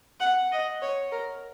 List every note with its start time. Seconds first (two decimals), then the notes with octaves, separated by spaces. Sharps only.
0.20 F#5
0.52 D#5
0.82 C#5
1.12 A#4